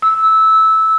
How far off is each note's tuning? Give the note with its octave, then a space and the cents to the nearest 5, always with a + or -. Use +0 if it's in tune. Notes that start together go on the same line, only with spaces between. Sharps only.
E6 -15